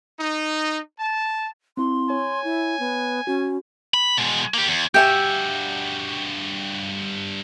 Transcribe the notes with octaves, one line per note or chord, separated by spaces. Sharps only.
D#4
A5
C4 E4 C6
C#5 G#5
E4
B3
C#4 F#4
B5
B2 G#3
A#3 G4
E2
G2 F#4 G4 E5 G#5 G6